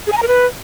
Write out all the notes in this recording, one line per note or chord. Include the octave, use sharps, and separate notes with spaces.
G#4
G#5
A#5
A#4
B4